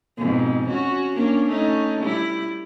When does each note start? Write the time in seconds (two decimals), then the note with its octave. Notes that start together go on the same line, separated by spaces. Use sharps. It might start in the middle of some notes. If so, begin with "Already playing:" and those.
0.18 F2 G#2 B2
0.68 C#4 F#4
1.15 A#3 C#4 D4
1.48 A3 C#4 D#4
2.01 G3 E4